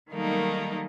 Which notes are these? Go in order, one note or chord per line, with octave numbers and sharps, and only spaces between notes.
D#3 F#3 G3 A3 A#3 D#4